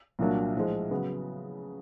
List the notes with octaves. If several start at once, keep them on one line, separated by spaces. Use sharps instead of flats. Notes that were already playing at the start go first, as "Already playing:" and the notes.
C2 A#2 F#3 A#3 D4
A2 F3 G#3
C#3 F#3 B3